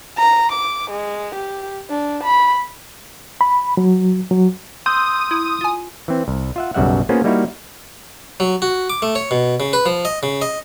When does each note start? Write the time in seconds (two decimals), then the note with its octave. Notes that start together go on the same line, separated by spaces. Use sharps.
0.18 A#5
0.52 D6
0.91 G#3
1.35 G4
1.90 D4
2.24 B5
3.41 B5
3.77 F#3
4.31 F#3
4.86 C6 D#6 E6 G6
5.31 E4
5.61 F4 G#5
6.08 E3 C4
6.28 C2
6.56 F4 E5 F#5
6.74 B1 F#2 C#3 G3 E5 F#5
7.09 A#3 B3 C#4 F4 G#4 C5
7.24 G3 A#3 D#4 E4 F#4 F5
8.40 F#3
8.62 F#4
8.90 D6
9.02 A3
9.15 C#5
9.31 B2
9.60 C#3
9.73 B4
9.86 F3
10.05 D#5
10.23 C#3
10.42 D#5